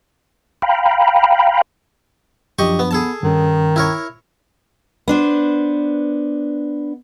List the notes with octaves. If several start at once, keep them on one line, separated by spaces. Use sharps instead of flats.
F5 G5 A#5 B5
F#2 F3 D4 G4 D#5 C#6
B3
B3 G#4 A4 A5
G2 D#3 C#4
E4 A#4 C#5
B3 D4 C5